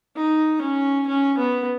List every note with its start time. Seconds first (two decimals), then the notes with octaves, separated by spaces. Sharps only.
0.16 D#4
0.61 C#4
1.07 C#4
1.38 B3